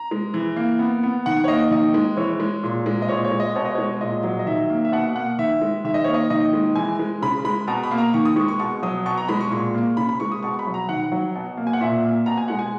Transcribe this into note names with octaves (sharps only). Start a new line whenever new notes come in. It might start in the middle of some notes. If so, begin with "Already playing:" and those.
Already playing: A#5
G#3
E3
A#3
B3
B3
D#3 F#5
C#5
A#3 D#5
D#3 D#5
G#3
E3 C#5
G#3
A#2
G#3
D#5
A#2 C#5
C#5
G#3
D#5
B2 C#5
D#5
G#3 C#5
A#2 D#5
F#3
D#5
D#3 E5
A#3
E5
B2 F#5
A#3 F#5
D#3 E5
G#3
D#3 E5
D#5
A#3 C#5
D#5
D#3 D#5
G#3
E3 G#5
G#3
C#3 B5
G#3 B5
B2 A#5
B5
A#3
A#5
D#3 C#6
D#6
G#3 C#6
C#6
B2 C#6
F#3 D#6
B2 C#6
A#5
G#3 B5
C#6
A#2 C#6
A#3
C#3 B5
B5
G#3 C#6
D#6
B2 C#6
B5
F#3
A#5
D#3 F#5
F#3
B2
A#3
G#5
F#5
A#2 E5
A#3
B2 A#5
G#5
G#3 F#5
G#5